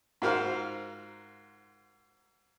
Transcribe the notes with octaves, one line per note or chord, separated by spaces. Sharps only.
G#2 F4 F#4 A#4 C5 F5